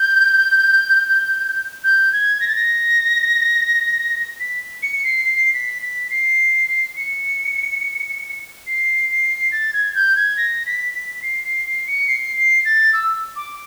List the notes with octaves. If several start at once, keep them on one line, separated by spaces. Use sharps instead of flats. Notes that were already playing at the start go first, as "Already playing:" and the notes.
Already playing: G6
G6
G#6
A#6
A6
A#6
B6
C#7
C#7
C7
C7
B6
B6
C7
C#7
C7
C7
A6
G#6
G6
G#6
A#6
B6
B6
C7
C7
C7
C#7
C7
C7
A6
E6
D6